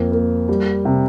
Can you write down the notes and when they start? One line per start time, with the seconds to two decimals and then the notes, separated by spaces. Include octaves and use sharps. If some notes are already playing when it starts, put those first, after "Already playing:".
Already playing: F2 A#3
0.12 A#3
0.49 G3
0.85 C3